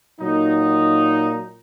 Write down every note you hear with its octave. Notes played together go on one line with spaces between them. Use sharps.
A#2 F#3 D#4